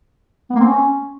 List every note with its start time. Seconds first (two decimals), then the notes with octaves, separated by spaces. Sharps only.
0.50 B3
0.55 A#3
0.60 C4
0.65 C#4